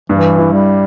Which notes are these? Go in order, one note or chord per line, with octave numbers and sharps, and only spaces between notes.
G2 E3
E4
G3